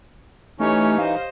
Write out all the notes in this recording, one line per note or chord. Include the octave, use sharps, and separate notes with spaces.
E3 A3 C#4 D#4 G4 C#5
C5 D#5 F5